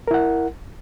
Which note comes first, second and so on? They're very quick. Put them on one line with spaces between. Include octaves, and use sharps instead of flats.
A#4 E4 F#5